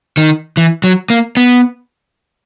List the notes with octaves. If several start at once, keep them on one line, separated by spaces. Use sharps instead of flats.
D#3
E3
F#3
A#3
B3